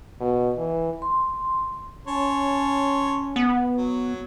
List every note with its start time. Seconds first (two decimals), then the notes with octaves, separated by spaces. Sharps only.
0.21 B2
0.57 E3
1.02 C6
2.07 C#4 C#5 A5 C6
3.36 B3
3.77 F#3